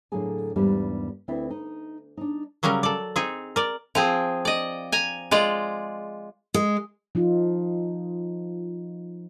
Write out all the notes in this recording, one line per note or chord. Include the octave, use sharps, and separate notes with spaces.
A2 D3 F#3 A#3 G#4 G#5
E2 G#2 G3 A#3 D4 B4
D2 C4 E4 B4 D5 E5
D#4
D4 D#4
C#3 F#3 G3 C#4 A#4
A4 D5
C4 D#4 G#4
A#4 D5
F3 C4 G#4
D5 D#5
G#5 A#5
G#3 F4 D5
G#3
F3 D#4 F4